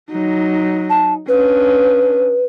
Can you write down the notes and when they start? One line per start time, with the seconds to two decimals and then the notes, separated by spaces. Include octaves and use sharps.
0.11 F#3 D#4
0.90 A5
1.28 C#4 D4 B4